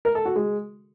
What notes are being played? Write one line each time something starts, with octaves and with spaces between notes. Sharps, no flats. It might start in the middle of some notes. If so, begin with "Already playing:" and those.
A#4
A4
F#4
G#3